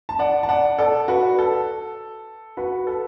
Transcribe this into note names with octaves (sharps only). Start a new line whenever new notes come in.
A5
D5 F#5
A5
D5 F#5
A4 D5
F#4 B4
A4
F#4 B4
A4